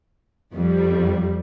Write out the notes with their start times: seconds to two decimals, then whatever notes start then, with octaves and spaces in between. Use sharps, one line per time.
0.54 F2 G3